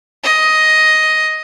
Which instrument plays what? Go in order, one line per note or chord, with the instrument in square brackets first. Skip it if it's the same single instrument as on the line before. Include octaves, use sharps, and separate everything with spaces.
[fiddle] D#5